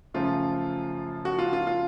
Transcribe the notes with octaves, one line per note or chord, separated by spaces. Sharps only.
F#2 C#3 F3 A3 F4
F#4
F4
F4
F4